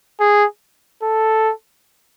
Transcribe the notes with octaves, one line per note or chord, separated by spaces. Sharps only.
G#4
A4